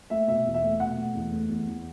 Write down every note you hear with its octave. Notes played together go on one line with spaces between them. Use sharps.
A3 E5
B2 E5
E2
E5
A3
B2 F#5
A3
E2
A3
E2
E2